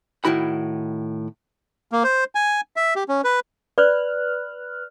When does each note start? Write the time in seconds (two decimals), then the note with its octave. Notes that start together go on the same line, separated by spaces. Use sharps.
0.25 A2 D#3 E4 F#4 B5
1.91 A#3
2.04 C5
2.35 G#5
2.76 E5
2.96 G4
3.09 C#4
3.24 B4
3.78 B4 D5 F6 F#6